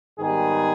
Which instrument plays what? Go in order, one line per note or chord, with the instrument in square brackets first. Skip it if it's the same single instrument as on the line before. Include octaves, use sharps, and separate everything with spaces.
[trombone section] G#2 D#3 G3 B3 G#4